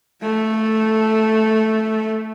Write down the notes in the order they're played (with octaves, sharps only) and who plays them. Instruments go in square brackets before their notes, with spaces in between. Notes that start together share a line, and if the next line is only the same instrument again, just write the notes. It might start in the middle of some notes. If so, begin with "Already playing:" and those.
[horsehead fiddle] A3 A4